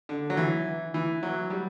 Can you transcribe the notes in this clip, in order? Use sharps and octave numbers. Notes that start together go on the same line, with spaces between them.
D3
F#3
E3
E3
F#3
G3